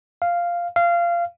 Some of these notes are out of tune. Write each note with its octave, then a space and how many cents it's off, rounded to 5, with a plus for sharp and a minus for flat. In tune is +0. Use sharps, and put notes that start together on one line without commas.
F5 -5
F5 -20